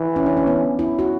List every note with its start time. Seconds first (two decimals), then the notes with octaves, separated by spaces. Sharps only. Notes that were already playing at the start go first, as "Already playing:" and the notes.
Already playing: E3
0.16 C#4
0.26 D4
0.37 C#4
0.47 B3
0.79 E4
0.99 F#4